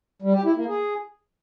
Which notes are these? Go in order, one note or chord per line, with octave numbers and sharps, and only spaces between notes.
G3
G4
E4
A#3
G#4